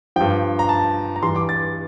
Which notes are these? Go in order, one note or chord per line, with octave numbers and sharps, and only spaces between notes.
G2 F3 G5
A#5
A5
A#5
G2 E3 G3 C6
D6
A6